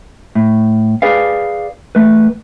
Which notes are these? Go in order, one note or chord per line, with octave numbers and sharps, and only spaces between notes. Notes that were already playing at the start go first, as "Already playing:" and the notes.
A2
G#4 B4 D5 F5
E2 A3 B4